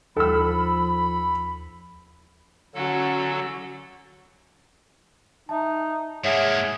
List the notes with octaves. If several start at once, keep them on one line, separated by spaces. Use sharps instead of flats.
D#2 F3 A4 B5 E6
D3 F#3 C#4 F#4 A4
D#4 E5 A5
G#2 A#3 G#4 C#5 E5 F#5